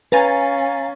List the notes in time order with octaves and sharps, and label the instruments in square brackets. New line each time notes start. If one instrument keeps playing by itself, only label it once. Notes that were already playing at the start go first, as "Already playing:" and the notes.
[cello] C#4 [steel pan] B4 [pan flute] F5 [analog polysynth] G#5 A#5 A6